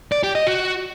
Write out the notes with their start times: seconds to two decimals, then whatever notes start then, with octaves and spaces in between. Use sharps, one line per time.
0.12 D5
0.23 G4
0.35 D#5
0.47 F#4